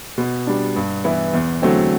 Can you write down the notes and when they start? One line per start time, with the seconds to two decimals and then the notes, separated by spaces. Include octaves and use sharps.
0.18 B2
0.47 G3 D4
0.76 G2
1.04 E3 B3 E4
1.34 E2
1.62 D3 F#3 A3 C4